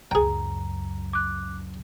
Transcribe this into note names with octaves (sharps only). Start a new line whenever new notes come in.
C#2 F#2 G#4 G5 A#5
D6 F#6